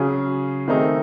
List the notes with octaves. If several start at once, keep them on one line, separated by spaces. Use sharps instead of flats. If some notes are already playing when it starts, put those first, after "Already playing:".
Already playing: C#3 F#3 C#4 G#4
D#3 A3 C4 D#4 G#4